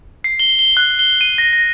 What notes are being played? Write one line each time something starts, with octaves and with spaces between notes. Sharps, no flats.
C7
G7
G7
F#6
G7
D#7
A#6
A#6